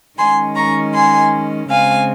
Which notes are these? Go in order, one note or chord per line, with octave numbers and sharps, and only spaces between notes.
D#3 G#3 C#4 G#5 C6
A#5 C#6
G#5 C6
C#3 G#3 C4 F5 G#5